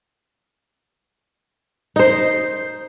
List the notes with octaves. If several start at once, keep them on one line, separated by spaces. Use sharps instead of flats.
D#4 C5